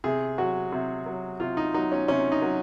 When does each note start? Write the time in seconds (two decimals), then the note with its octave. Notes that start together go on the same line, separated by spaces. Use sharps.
0.04 C3 G#4
0.38 F#3 F#4
0.72 C3
1.06 F#3
1.40 C3 F4
1.57 D#4
1.74 F#3 D#4
1.92 C#4
2.08 C3 C#4
2.32 D#4
2.42 F#3